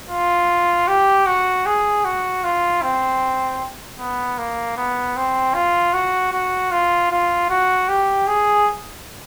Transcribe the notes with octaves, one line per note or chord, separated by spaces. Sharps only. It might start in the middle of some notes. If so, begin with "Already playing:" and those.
F4
G4
F#4
G#4
F#4
F4
C4
B3
A#3
B3
C4
F4
F#4
F#4
F4
F4
F#4
G4
G#4